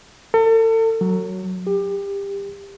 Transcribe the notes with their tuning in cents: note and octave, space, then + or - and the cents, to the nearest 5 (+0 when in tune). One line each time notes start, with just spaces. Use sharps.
A4 +40
F#3 +0
G4 +25